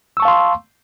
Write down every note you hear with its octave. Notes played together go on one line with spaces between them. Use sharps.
F5 A5 C6 C#6 E6